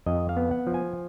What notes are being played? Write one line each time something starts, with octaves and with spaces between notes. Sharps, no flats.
F2 D#5
F5
B3
F#5
F3
G#5